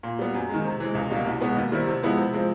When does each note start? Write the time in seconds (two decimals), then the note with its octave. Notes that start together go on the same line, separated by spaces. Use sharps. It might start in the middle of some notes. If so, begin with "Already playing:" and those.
0.03 A#2
0.19 G3 B3
0.34 F#2
0.49 D#3 G#3
0.64 C3
0.80 E3 G#3
0.95 C#2
1.10 B2 G3 A#3
1.26 C2
1.41 B2 G#3 B3
1.56 D#2
1.72 D#3 G3 C4 E4
1.87 C3
2.02 F3 G#3 B3 E4
2.17 C3
2.33 F3 G#3 C4